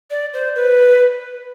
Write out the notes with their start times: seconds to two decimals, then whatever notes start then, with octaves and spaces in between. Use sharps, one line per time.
0.11 D5
0.34 C5
0.55 B4